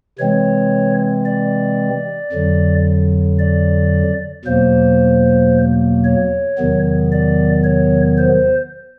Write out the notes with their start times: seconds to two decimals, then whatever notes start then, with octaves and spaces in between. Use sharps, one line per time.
0.19 C3 E3 G#3 C4 C#5
1.25 D5
2.33 F2 D3 F#3
3.39 D5
4.45 E2 B2 F#3 A#3 C5
6.05 C#5
6.58 E2 C3 D#3 F#3 B3
7.12 D5
7.64 C#5
8.18 C5